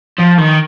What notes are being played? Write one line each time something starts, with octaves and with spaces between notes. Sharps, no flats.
F3
D#3